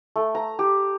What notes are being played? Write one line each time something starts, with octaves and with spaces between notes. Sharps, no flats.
A3
A#5
G4